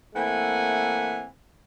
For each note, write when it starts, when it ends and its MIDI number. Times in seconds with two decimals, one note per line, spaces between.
0.15 1.26 52
0.15 1.26 57
0.15 1.26 58
0.15 1.26 60
0.15 1.26 78
0.15 1.26 80